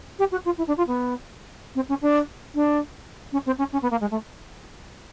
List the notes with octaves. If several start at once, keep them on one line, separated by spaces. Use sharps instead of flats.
G4
F#4
F4
E4
D4
F4
B3
C4
C#4
D4
D4
C#4
C4
C#4
C#4
B3
A#3
G#3
A3